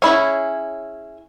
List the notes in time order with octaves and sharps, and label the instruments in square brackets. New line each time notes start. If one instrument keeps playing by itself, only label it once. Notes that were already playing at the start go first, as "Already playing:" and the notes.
[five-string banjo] C#4 E4 G#4 C#5